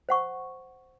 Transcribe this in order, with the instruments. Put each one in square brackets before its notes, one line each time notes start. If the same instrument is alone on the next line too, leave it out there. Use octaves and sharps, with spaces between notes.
[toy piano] C5 F#5 C#6